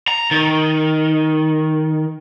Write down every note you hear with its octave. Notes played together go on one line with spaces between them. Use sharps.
A#5
D#3